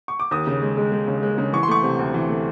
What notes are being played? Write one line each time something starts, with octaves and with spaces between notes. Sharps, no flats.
C#6
D6
D#2 D#6
C#3
G#3
G#3
G#3
C#3
G#3
C#3
E3 C#6
C6
A3 C#6
C3
D2
E3
A3